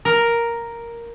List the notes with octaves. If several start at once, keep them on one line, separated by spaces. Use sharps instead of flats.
A#4